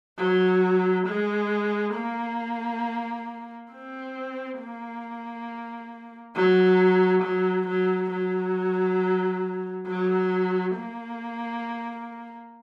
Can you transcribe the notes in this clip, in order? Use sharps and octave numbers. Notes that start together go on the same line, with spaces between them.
F#3
G#3
A#3
C4
A#3
F#3
F#3
F#3
F#3
F#3
A#3